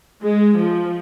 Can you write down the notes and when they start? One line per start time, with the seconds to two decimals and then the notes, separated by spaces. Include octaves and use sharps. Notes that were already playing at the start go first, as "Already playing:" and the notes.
0.22 G#3
0.56 F3